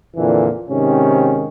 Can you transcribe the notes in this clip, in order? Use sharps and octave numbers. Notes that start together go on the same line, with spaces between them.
F2 A#2 D3 E3
G#2 C3 D#3 C#4